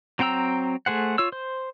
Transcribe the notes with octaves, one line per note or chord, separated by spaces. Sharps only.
F#3 C4 G5 A#5 E6
A3 G#4 C5 F#5
F4 C#5 E6
C5